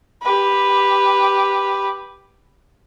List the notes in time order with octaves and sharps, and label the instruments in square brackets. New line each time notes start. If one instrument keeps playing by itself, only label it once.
[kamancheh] G4 B4